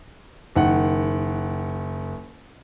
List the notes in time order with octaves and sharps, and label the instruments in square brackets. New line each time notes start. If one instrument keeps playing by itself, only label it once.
[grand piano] F#1 D#3 F#5